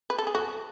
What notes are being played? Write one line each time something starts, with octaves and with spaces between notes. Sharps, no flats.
B4
A4
G#4
F#4 A4